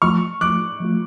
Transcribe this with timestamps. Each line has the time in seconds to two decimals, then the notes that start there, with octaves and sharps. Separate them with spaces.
0.02 F3 A3 F4 C#6 F6
0.41 F3 A3 F4 D6 F#6
0.80 F3 A3 F4